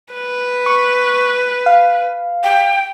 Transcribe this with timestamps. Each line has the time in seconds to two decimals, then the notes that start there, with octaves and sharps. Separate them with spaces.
0.14 B4
0.66 C#6
1.66 F5
2.44 G5